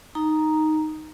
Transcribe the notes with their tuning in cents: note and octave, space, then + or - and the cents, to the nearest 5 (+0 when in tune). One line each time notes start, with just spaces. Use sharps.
D#4 +0 A#5 +0